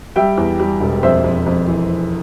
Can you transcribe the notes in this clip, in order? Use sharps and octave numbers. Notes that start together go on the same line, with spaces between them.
G3 E5 G5
E2
G3
E1
F2 C5 E5
F2
F2
E3